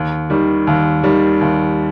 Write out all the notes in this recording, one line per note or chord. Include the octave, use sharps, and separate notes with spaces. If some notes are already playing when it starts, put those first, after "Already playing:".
Already playing: D#2
D#3 G3
D#2
D#3 G3
D#2